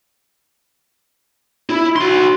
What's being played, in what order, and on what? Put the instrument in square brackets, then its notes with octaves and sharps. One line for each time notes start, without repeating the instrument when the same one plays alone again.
[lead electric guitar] E4
F#4 C6